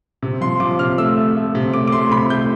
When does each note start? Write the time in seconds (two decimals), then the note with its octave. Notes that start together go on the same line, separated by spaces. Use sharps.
0.23 C3
0.41 F3 C6
0.60 F3 D6
0.79 C3 F6
0.98 A3 E6
1.17 A3
1.36 A3
1.55 C3
1.73 A3 D6
1.88 D6
1.92 A3 C6
2.11 C3 B5
2.30 A3 G6